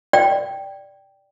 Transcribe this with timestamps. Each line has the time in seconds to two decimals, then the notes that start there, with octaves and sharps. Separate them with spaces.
0.13 D5 G5